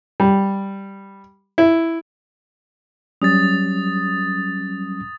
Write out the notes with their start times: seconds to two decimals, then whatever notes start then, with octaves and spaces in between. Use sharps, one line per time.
0.20 G3
1.58 E4
3.22 F#3 G3 C#4 D#6 A6